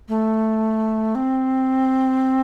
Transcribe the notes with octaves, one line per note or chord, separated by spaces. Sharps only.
A3
C4